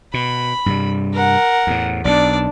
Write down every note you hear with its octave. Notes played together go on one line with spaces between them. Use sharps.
B2 B5
G2 C3 G3
A#4 F#5
E2 A2
B1 B2 D4 D5